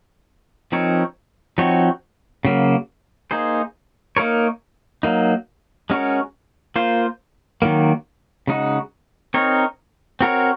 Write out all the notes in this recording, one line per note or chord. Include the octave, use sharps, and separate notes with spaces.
F3 C4 D#4 A#4 C#5
F3 C4 D#4 F#4 C#5
C#3 F#3 A#3
A#3 D#4 G#4 C5
A#3 D#4 A#4 C#5
F#3 A#3 D#4
G#3 C#4 F#4 A#4 C#5
A#3 F4 C5
D#3 F#3 A#3
C#3 G#3 D#4 F#4
C4 D#4 A#4 C#5
C4 F#4 A#4 C#5